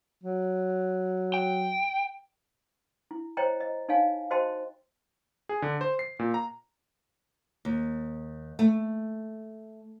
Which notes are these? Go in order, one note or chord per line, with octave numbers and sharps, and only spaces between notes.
F#3
G5
E4
C5 C#5 D#5 G5 A#5
D#5
D#4 A4 C#5 F5 G#5
F#4 C5 D#5 G5 A5 C6
G#4
D3
C5
C7
A#2
A#5
D#2
A3